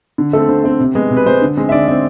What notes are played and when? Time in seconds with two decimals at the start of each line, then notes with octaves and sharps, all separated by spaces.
0.18 D3
0.33 A3 C4 A4
0.49 D3 C5
0.64 A3 C4
0.80 C3
0.95 G#3 B3
1.11 C3
1.17 B4
1.26 G#3 B3 C5
1.42 D3
1.57 G#3 C4
1.69 E5
1.72 D3 D5
1.88 G#3 E5
1.91 C4